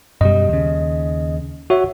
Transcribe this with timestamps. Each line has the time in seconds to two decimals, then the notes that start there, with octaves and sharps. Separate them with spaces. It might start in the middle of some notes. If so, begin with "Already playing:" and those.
0.21 F#2 B2 G3 D#5
0.49 D#2 C#3
1.70 F#4 C#5 E5